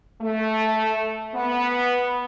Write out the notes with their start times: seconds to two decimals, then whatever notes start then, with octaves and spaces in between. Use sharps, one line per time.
0.22 A3
1.35 B3